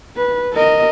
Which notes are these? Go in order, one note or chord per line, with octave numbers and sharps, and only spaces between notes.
B4
A#4 D#5